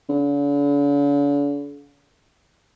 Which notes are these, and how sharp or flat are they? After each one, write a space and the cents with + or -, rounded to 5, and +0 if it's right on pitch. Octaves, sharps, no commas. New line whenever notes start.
D3 -45